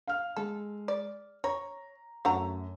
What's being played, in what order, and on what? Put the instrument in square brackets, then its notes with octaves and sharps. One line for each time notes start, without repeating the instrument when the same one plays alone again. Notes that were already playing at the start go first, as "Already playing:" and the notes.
[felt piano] F5 F6
[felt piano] G#3 [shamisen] A4
[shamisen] D5
[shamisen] C#5 [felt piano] A#5
[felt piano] F#2 [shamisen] A3 F#5 A#5